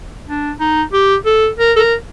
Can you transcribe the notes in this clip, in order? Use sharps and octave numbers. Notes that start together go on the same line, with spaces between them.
D4
D#4
G4
A4
A#4
A4
A#4